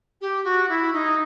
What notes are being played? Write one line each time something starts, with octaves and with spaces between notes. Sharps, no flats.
G4
F#4
E4
D#4